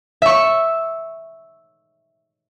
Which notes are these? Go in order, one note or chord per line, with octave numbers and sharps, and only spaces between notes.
E5 C#6